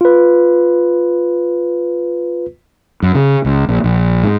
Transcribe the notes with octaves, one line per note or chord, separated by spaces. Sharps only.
F4 B4
F#2
C#3
C#2
A#1
A#1
G#2